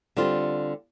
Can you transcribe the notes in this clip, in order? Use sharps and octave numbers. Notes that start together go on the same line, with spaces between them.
D3 G3 C4 F4